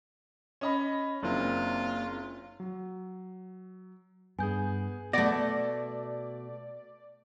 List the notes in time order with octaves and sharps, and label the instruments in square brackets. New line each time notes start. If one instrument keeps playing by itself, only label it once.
[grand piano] C#4 D#5 B5
[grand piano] F#1 [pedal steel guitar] A#3 C4 D4 [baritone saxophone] F4
[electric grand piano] F#3
[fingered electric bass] G2 [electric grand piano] B3 G#4 [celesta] G#5 G6
[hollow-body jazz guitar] B2 [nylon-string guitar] A3 F#5 [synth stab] D5 [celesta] A#6